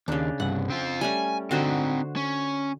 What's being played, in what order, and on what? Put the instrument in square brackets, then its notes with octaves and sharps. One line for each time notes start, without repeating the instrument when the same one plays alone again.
[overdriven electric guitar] D#2 [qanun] C#3 D4
[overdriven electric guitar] C2 G2 [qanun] F#5
[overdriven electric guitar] C4 F4
[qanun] G3 A3 C#4 [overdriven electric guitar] G#5
[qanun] D3 F#4 C5 [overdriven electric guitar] C4 D#4
[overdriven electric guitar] C#4